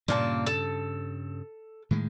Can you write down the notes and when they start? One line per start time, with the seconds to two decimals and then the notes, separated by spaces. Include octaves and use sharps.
0.08 G2 A#2 C#3 A#3 A5
0.46 A4
1.91 A2 D#3 G#3